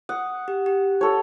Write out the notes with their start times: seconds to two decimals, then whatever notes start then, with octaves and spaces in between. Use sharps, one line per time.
0.09 F#5 D#6
0.48 G4
0.66 G4
1.01 A4 C#5